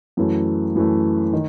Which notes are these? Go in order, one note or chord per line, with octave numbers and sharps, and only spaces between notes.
F#2 E3 A3
F#2 E3 A3
D#3